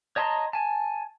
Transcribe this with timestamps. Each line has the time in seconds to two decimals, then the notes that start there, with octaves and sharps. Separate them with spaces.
0.16 C#5 D#5 A5 A#5 C6
0.53 G#5 A5